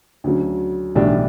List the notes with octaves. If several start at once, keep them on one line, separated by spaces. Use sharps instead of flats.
D2 C#3 F#3
B1 A2 E3 G3 D4